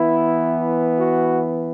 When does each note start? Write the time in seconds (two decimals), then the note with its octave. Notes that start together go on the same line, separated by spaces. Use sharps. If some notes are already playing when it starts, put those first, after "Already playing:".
Already playing: E3 B3 E4
0.99 F#4